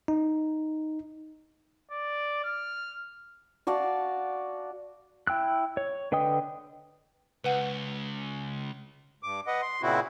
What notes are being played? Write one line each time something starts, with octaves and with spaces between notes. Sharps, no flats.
D#4
D5
F6
F#4 D5 F5 A5
E4 G5 E6 F#6
C#5
D3 B4 D#5 G5 D#6
C#2 B4 F#5
G2 D6
B4 D#5 F#5
C6
A#2 C#3 C4 E4 F#4